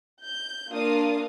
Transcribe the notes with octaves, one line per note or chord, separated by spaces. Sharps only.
G6
A#3 D4 F4 A#4 F5 D#6